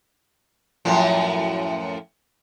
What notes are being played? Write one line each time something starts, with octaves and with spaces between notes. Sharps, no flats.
F#2 A2 F3